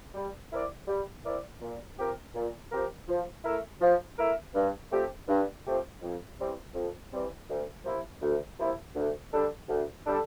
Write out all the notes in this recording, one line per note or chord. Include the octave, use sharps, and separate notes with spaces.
G3
C4 E4 A#4 D5
G3
C4 E4 A#4 D5
A#2
F3 C4 G4 A#4
A#2
F3 C4 G4 A#4
F3
A3 E4 A#4 E5
F3
A3 E4 A#4 E5
G2
F3 A3 C4 G4
G2
F3 A3 C4 G4
F2
E3 G3 C4
F2
E3 G3 C4
D2
C3 F3 A#3 E4
D2
C3 F3 A#3 E4
D2
D3 G3 D4 A4
D2
D3 G3 D4 A4